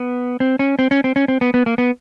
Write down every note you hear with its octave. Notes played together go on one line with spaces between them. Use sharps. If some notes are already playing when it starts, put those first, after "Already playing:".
Already playing: B3
C4
C#4
C4
C#4
C4
C#4
C4
B3
B3
A#3
B3